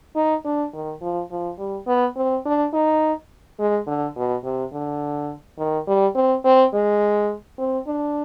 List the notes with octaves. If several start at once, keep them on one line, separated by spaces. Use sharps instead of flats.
D#4
D4
D#3
F3
F3
G3
B3
C4
D4
D#4
G#3
D3
B2
C3
D3
D#3
G3
C4
C4
G#3
C4
D4